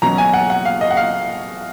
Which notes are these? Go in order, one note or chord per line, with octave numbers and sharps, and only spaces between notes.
B2 F#3 C#4 A#5
G#5
F#5
F#5
F5
D#5
F#5
F5